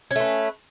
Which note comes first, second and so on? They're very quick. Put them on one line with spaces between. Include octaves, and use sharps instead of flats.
C#4 A3 B4